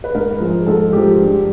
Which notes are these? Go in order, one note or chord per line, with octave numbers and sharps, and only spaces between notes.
B4
G#2 A#4
F3 G#3
G#2 A4
F3 G#3 G4
G2